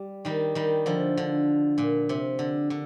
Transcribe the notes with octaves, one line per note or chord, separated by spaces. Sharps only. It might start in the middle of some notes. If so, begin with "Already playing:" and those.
Already playing: G3
D#3 G3
D#3 G3
D3 F3
D3
A#2
C3
D3
D3